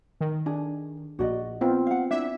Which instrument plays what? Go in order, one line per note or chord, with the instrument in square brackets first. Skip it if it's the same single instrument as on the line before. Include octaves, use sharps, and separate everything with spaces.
[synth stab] D#3
[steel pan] D4 [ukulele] G#4
[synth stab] A#1 [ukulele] F#4 D5 D#5
[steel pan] B3 C4 F4
[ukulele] F5 F#5
[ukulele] D4 E4 [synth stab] E5